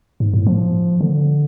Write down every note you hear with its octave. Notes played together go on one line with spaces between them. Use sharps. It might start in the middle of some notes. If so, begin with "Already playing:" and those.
G#2
A2
F3
D3